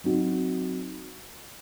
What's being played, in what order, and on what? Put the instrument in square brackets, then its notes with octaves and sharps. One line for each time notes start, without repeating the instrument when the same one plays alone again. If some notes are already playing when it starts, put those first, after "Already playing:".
[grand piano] F#3 C4 D#4 F#4